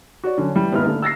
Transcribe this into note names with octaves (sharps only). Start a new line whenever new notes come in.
F#4 C#5 D5
D3 F#3 C#4
E3 G3
D#1 G#2 B3 D#4 E4 F6
D3 A3
E6 A6 A#6 C7